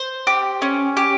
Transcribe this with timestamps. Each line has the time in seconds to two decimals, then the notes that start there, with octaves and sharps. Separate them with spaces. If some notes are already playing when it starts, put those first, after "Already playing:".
Already playing: C5
0.27 G4
0.62 C#4
0.97 G4